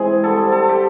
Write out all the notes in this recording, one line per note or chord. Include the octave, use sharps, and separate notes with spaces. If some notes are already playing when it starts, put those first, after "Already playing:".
Already playing: E3 G#3 C4 G#4
D3 G3 C4 A4
A4
G4